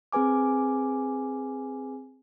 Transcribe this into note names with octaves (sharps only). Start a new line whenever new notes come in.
C4 G#4 B4 G#5 D6